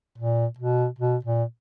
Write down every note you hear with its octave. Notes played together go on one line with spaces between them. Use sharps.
A#2
B2
B2
A#2